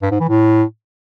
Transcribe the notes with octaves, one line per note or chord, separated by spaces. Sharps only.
G2
G#2
E3
A2